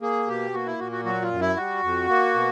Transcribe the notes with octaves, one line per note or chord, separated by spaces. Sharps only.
A#3 G#4
B2 G4
A#3 F#4
E4
A#2 F#4
F#4
F#3 F#4
F4
F#2
E4
G3 F#4
F2
A#3
B2